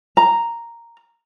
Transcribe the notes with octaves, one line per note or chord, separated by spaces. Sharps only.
A#5